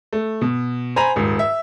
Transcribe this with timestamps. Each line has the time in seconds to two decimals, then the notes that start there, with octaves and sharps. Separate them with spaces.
0.13 A3
0.41 B2
0.96 C5 G#5 A#5 B5
1.16 D#1 G#2
1.39 E5